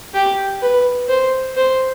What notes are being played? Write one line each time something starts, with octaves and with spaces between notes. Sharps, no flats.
G4
B4
C5
C5